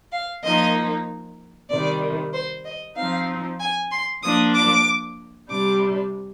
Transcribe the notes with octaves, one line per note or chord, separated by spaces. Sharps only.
F5
F3 A#3 D#4 D#5
C3 D#3 G3 D5
C5
D#5
F3 C4 D#4 F5
G#5
C6
F3 A#3 D4 D#6
D6
C3 G3 D4 D6